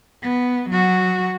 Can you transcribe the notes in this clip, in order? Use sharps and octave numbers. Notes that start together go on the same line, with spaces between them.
B3
F#3 F#4